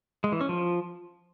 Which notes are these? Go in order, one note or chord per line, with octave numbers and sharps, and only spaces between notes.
G#3
E3
C#4
F3